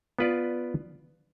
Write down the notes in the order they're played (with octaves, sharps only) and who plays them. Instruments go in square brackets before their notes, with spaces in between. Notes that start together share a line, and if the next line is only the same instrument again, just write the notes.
[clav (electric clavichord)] B3 F4 B4 D5